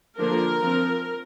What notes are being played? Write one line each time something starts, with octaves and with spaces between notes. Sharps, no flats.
D3 F3 A#3 D4 A#4
F3 C4